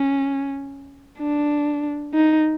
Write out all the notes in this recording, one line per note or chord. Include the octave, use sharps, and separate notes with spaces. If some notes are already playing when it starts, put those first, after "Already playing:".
Already playing: C#4
D4
D#4